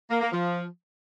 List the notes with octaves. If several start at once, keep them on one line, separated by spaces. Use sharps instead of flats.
A#3
A#3
F3